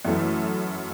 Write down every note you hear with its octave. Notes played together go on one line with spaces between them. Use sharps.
F#2 E3 A3